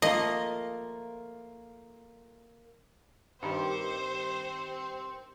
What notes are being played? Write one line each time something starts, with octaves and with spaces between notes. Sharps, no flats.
F3 A3 A#3 F4 D#5
G2 D#3 C4 G4 C5 C#7